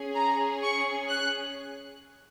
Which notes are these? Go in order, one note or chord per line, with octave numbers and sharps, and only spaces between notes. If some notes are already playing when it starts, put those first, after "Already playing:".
Already playing: C#4 G#4
A#5
C#6
F#6